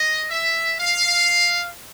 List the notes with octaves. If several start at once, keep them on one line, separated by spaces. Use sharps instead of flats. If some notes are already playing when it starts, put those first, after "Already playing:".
Already playing: D#5
E5
F5